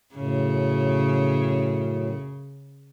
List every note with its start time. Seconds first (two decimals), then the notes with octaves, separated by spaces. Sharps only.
0.15 F#2 A2 C#3